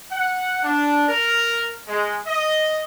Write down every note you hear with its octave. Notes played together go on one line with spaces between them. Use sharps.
F#5
D4
A#4
G#3
D#5